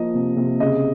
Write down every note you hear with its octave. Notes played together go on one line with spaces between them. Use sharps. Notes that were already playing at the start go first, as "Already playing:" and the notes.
Already playing: F3 A#3 D#5
C3
C3
C#3 D#5